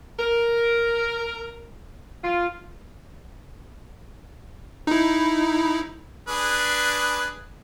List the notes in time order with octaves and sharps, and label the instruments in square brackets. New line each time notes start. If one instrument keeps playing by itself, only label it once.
[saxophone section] A#4
F4
[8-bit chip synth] D#4 E4
[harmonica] D4 G#4 B4